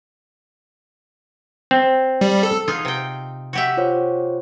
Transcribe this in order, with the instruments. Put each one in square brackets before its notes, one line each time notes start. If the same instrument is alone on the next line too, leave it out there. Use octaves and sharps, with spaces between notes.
[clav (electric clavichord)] C4
[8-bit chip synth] G3
A4
[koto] D#4 F4 G#4
C3 G5
F#4 G4 E5
[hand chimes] F4 C5 C#5